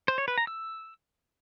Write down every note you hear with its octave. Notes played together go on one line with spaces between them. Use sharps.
C5
C#5
B4
A#5
E6